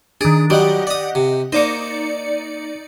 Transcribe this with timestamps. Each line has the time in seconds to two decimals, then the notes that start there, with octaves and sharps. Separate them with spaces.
0.21 D#3 D4 G#4
0.50 F#3 G3 G4 D#5 F#5
0.87 D5 D#6
1.15 C3
1.53 A#3 D#4 C5 D5 C#7